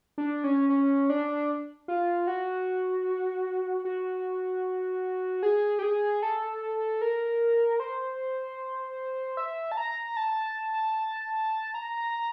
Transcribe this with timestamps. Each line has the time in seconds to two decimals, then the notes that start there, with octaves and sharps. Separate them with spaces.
0.18 D4
0.44 C#4
0.69 C#4
1.10 D4
1.88 F4
2.27 F#4
3.85 F#4
5.43 G#4
5.79 G4
5.82 G#4
6.23 A4
7.01 A#4
7.80 C5
9.37 E5
9.72 A5
9.77 A#5
10.17 A5
11.74 A#5